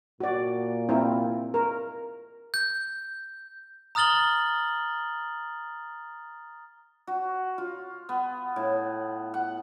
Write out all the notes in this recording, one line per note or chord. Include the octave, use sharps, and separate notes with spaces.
A#2 F#4 D5
C4 E4 A#4
A#4
G6
A#5 D#6 F6 A6 F#7 G7
F#4
F4
B3
A2
F#5